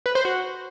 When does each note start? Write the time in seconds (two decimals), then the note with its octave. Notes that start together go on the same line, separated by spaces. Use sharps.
0.06 B4
0.15 C5
0.25 F#4